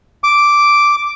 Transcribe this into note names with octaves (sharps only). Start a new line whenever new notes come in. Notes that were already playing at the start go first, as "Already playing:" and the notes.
D6